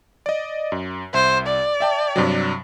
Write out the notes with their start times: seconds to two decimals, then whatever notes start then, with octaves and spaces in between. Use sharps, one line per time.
0.26 D5 D#5
0.72 F#2
1.14 C2 C5 E5
1.47 D5
1.80 E5 G5 A5
2.16 G2 C3 F#3